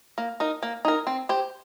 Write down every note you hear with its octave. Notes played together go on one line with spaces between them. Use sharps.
A#3
D#4 A#4
A#3
D#4 A#4
C4
G4 C5